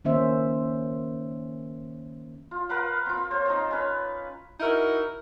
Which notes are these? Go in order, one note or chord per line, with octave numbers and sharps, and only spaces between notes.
D#3 A#3 C#4 C5 E5
F4
A#4 B4 F5 F#5
C4 F4
C5 C#5
C4 D#4
C#4 B4 F5
D#4 E4 F#4 A#4 E5